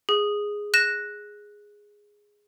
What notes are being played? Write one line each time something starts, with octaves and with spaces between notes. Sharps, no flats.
G#4
F#6 A#6 E7